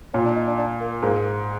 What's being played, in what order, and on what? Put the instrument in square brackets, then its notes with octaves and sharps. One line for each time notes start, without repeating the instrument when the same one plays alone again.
[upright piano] A#2 [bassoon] C#4
[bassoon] D4
D#4
D4
D4
A#3
[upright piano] G#2 [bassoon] A#3